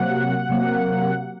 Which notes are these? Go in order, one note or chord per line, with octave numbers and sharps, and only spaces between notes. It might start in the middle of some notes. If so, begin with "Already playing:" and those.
Already playing: C3 F#3 A#3 F#5
C3 F#3 A#3